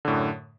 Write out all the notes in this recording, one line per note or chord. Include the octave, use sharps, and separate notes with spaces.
F#2 A2 D3